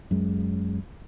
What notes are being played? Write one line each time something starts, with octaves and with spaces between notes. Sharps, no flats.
F#2 G#3